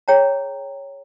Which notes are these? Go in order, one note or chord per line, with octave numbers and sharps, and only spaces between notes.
G#4 C#5 G5 A#5